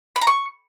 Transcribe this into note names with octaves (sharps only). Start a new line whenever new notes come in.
B5
A#5
C#6